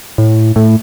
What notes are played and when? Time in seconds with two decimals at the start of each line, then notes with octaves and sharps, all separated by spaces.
0.18 A2
0.56 A2